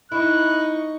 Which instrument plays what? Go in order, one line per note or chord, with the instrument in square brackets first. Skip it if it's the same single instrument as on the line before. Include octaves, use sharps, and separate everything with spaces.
[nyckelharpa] D#4 C#6 [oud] E4 [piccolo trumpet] F#6